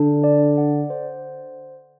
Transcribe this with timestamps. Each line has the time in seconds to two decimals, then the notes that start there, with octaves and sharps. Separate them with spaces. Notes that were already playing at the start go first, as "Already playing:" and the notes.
Already playing: D3 D4
0.24 D5
0.58 F#5
0.90 C5